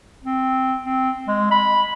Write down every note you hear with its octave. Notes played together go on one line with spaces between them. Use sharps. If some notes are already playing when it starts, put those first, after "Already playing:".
C4
C4
G#3
B5